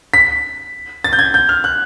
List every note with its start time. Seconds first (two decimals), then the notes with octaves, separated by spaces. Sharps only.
0.14 B6
1.04 A6
1.13 G6
1.19 G#6
1.34 G6
1.49 F6
1.64 F#6